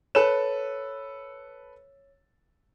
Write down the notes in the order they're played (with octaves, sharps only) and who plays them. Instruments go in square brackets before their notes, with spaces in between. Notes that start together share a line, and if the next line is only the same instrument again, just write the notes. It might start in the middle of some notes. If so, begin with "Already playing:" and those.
[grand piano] A4 B4 E7 [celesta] C#5